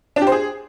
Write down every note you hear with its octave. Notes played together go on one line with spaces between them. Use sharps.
D4
G4
C5
G#4